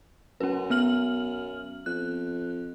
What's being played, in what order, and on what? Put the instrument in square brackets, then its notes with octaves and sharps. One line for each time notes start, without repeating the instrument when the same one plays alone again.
[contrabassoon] F#2 [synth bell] C#4 B4
[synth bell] B3 F6 F#7
[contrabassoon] F2 [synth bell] F#6